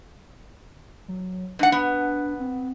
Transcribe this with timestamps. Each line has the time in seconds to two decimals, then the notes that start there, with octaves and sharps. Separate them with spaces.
1.08 F#3
1.59 G#2 D4 F#5
1.72 B3
2.40 C4